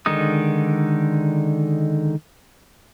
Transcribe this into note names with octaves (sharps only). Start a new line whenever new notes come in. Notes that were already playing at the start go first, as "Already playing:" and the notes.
D3 D#3 G#3 D#4 D#6